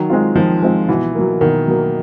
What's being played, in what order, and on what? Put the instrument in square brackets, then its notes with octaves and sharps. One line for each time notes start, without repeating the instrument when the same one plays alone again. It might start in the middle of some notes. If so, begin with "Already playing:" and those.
Already playing: [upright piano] D#3 [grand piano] F#3
[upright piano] G#3 C4 F4
[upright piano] D#3 [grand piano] F3
[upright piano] G#3 C4 F4
[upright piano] B2 [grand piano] E3
[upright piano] F#3 A#3
[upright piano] B2 [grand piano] D#3
[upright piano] F#3 A#3